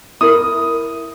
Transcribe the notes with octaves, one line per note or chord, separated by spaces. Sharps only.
E4 A#4 D#6